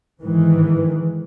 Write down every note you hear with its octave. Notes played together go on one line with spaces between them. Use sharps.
G#2 D#3 E3